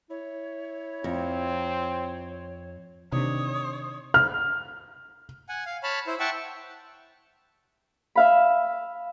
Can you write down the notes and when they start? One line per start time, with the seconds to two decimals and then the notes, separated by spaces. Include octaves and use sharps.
0.10 E4 C#5
1.04 F2 C4
3.12 C3 D#3 D4 C#5 D#6
4.14 F6
5.49 F#5 G#5
5.66 F5
5.83 C#5 A5 B5 F6
6.07 E4 C5
6.20 E5 F#5 G5 A5 C#6
8.15 E5 F5 B5